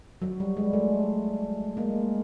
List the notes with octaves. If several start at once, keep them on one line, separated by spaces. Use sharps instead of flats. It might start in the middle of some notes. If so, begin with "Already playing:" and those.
F#3
G3
G#3
A3
G#3 A#3